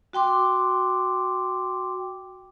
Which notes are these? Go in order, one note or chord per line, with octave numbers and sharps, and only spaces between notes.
F#4 G5 C6 D6